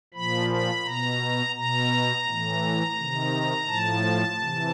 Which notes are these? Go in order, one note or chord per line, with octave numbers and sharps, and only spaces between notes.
A#2 F3 B5
B5
B2 A#5
B2 A#5
A2 E3
C3 D#3
A2 F3 A5
C3 E3